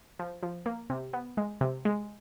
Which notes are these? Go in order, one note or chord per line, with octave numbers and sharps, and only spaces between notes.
F3
F3
A#3
C3
B3
G#3
C3
G#3